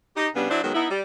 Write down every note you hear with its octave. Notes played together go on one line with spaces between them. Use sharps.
D#4 G4
C#3 G3 B3 D4
F#3 D4 E4 C5
D#3 F#3 G#3 B3
B3 D#4 E4
G3